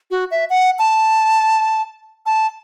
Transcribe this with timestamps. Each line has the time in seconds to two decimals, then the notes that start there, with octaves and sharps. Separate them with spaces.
0.11 F#4
0.31 E5
0.50 F#5
0.79 A5
2.26 A5